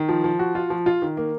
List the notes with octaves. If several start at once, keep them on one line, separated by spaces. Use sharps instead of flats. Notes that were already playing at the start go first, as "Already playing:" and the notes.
Already playing: D#3
F3
F3
F#4
F4
F3
F4
D#3
A#3